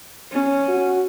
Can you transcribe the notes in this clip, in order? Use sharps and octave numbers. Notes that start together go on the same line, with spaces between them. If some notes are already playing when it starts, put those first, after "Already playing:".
C#4
F#4